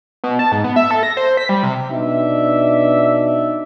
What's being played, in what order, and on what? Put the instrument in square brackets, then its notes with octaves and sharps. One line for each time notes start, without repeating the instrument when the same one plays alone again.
[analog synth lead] B2
A5
G#2
B3
E5
A4
A#6
C5
B6
G3
C3
[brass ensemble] B2 D4 D#4 D5 E5